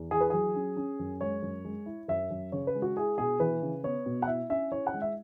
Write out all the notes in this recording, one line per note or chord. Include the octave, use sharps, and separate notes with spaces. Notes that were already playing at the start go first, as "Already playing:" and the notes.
Already playing: E2
E3 G#4
B4
F#3 G#4
C#4
C#4
F#2
G#3 C#5
F#2
G#3
E4
F#2 E5
F#2
C#3 C#5
B4
G#3
F#4
E4 G#4
B2 G#4
E3 B4
C#3
B3 C#5
B2
F#5
E4 E5
C#4 E5
E4 C#5
F#5
G#3
E5